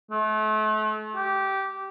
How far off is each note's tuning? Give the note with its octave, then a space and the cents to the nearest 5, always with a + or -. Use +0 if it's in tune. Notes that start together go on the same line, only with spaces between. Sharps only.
A3 -35
G4 -15